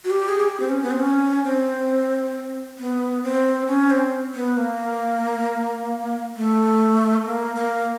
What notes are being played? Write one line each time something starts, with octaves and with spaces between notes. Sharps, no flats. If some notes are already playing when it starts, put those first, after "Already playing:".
F#4
G4
G#4
G4
C4
C#4
B3
C4
C#4
C4
B3
C4
C#4
C4
B3
A#3
A3
A#3
A#3